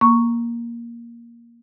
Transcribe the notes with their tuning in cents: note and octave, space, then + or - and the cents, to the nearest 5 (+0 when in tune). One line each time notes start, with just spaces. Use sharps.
A#3 +10 C#6 +0